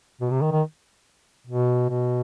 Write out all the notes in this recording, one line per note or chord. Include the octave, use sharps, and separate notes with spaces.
B2
C3
D#3
D#3
B2
B2